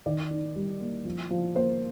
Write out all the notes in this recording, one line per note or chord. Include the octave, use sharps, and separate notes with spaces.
D#3 D5
D#4
G3
A#3
F3
F3
A#3 C5